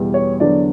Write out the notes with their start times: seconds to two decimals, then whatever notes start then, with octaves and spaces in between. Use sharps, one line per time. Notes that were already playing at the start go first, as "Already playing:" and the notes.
Already playing: E2 B2 G3
0.14 C#5
0.40 E2 D3 F#3 D5